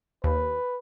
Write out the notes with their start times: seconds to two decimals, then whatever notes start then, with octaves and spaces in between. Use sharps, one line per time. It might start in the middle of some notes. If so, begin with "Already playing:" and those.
0.24 D#2 B4